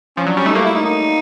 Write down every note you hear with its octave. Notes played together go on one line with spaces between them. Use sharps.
F3 C#4
F#3 D4
G3 C#4
A3 D#4
A#3 E4
E4
D#4
D#4